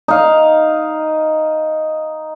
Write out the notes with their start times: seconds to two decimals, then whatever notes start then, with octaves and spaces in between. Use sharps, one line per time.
0.08 D#4 F5